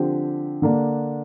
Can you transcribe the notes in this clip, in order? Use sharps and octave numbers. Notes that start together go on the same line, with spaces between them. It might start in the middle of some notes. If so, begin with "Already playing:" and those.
Already playing: D3 F3 C4 G4
D3 A#3 D4